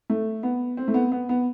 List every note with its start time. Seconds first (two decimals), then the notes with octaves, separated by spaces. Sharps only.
0.10 A3
0.43 B3
0.77 C4
0.88 A3
0.94 B3
1.12 B3
1.29 B3